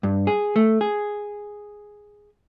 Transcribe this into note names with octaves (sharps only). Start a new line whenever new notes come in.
G2
G#4
A3
G#4